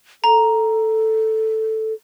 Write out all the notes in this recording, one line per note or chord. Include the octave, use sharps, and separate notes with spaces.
A4 A#5